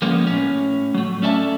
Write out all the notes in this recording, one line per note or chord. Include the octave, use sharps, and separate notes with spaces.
F3 G#3 A#3 B3 C#4
A2 C#4
F#3 A3
C#4 A4 D5 E5 G#5 A5